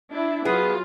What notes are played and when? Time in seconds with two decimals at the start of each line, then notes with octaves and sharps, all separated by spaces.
0.10 D4 E4
0.45 F#3 B3 F4 G#4